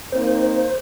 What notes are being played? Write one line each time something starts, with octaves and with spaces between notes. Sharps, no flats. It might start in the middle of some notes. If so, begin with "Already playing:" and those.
A#3 C4 D#4 C5